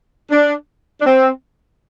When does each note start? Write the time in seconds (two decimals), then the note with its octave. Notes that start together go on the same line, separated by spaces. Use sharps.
0.30 D4
1.00 D4
1.05 C4